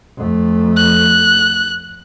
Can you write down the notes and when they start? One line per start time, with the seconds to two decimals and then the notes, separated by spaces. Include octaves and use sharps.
0.18 F2 A3
0.77 F#6